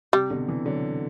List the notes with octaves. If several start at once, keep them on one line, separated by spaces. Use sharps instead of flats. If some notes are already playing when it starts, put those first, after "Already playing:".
C3 G3
B2 D3
C3 E3
D3 F#3